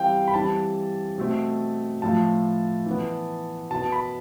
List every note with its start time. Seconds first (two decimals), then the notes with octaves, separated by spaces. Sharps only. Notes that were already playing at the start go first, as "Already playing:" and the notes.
Already playing: E3 G3 C4 F5 G5
0.28 B5
0.34 E3 G3 C4 A5
1.18 B2 A3 C4
2.02 A2 F3 A3 A5
2.86 E3 B3
3.71 B2 B3 A5
3.92 B5